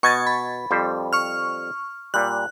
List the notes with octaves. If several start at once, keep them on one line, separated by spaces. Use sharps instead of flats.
B2 D#5 C#6 G#6 A6
B5
F2 G3 C5
C#6 F6
A#2 G3 F#6